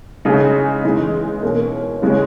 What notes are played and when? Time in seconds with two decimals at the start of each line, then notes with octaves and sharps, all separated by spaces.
0.25 C#3 G#3 D#4 G#4
0.83 E3 G#3 D#4
1.42 B2 A#3 C#4
2.02 C#3 G#3 C#4